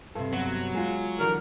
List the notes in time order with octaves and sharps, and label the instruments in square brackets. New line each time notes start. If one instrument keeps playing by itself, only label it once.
[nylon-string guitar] G2 C3 [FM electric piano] A4
[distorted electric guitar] F#3 [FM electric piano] B3
[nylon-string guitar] G#3 F4
[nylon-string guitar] D3 F#4 D5 [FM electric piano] E3 [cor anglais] A#4